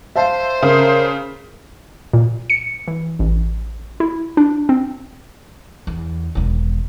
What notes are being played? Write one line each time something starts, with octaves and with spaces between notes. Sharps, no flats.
C5 E5 F5 A5
C#3 A#4
A#2
C#7
E3
A1
E4
D4
C4
E2
E1 D#3